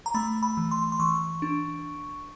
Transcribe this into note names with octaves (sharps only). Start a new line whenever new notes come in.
A#5
A3 B5
B5
E3
C6
C6
E3 C#6
D4